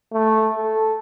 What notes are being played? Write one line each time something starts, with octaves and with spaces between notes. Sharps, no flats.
A3
A4